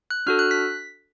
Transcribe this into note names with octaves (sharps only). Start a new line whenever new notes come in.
F#6
D4 F#4 A4 F6
F#6
B6